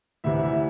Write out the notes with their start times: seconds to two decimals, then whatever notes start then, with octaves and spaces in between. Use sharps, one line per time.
0.24 D2 C3 E3 E5
0.43 E5